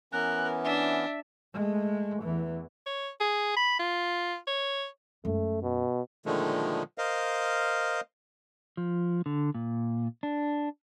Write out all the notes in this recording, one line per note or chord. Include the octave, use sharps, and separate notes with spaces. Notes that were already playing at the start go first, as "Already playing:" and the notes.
E3 B3 C#4 A#4 F#6
D4 E5
G#3 A3
E2 E3
C#5
G#4
B5
F4
C#5
F#2 G#3 A3
B2
A#2 D3 D#3 F3 G#3 A3
A#4 C5 D#5 F5
F3
D3
A#2
D4